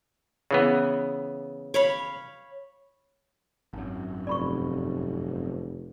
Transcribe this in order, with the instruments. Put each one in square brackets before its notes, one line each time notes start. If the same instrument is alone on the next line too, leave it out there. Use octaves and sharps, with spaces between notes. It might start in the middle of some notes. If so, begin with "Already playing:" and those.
[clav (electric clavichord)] C#3 E3 B3
[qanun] C#5 F5 B5
[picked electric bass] G#1 F#2
[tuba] F1 [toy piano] D5 B5 C#6